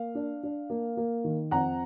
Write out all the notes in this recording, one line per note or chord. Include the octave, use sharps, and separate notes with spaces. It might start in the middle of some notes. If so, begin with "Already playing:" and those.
Already playing: A#3 F5
D4
D4
A#3
A#3
D#3
F2 F#5 A#5